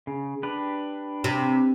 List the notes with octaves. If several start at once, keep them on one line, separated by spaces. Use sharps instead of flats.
C#3
D4 G4 B4
C3